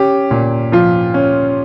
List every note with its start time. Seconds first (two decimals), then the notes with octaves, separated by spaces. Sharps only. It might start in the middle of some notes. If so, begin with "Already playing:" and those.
Already playing: C#4 G4
0.31 A#2
0.72 F3 F4
1.14 C#4